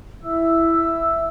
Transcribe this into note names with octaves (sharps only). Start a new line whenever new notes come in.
E4 E5 E6